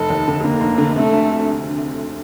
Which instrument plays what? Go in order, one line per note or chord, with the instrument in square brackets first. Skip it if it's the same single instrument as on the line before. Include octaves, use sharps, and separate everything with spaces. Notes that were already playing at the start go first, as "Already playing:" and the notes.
Already playing: [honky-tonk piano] F1 [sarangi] A4
[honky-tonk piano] D#2
D3
[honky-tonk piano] D3 [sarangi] A#3
[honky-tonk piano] F1
D3
[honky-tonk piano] C3 [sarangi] A3
[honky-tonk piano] D2